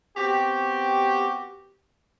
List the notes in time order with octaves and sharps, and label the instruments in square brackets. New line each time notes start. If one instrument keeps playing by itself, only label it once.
[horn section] B3 C4 F#4 G4